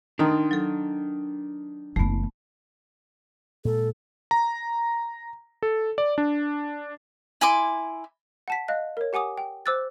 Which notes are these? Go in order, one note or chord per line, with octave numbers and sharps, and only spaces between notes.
D#3 D4 D#4 A#5 C6
F#3 A4
F#1 E3 A3 B3
A#2 G#3 A4
A#5
A4
D5
D4
E4 G#5 C6 D6
F#5 A5 B6
D#5 F5 F#6
A#4 C#5
G4 F#5 G#5 D6 D#6
G5
C5 D6 E6 F#6 A6